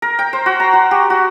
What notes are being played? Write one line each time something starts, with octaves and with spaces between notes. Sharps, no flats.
A#4
G5
C5
F#4
A#5
F#4
G4
F#4